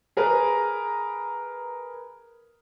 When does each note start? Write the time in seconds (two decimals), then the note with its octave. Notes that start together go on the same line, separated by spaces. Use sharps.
0.17 G#4 A#4 B4 A#5